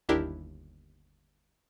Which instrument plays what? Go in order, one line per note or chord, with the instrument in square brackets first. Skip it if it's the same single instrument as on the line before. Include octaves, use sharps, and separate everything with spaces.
[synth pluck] G1 D#2 D4 E4 G4 A#4